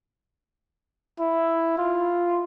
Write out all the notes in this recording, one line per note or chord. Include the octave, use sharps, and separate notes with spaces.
E4
F4